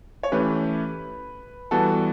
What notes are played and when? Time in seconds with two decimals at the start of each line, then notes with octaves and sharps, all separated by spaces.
0.23 C#5
0.32 E3 A3 C#4 G4 B4
1.71 E3 G3 B3 F#4 A4 A5